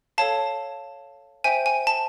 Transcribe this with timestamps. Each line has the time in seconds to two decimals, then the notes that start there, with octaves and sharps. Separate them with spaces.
0.18 A4 C#5 F5 A5
1.44 C5 E5 G5 G#5
1.66 G#5
1.87 A5